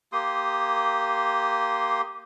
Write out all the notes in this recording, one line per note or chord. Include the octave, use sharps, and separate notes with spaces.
A#3 G4 C6 D#6